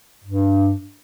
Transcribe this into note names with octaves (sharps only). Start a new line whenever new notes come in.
G2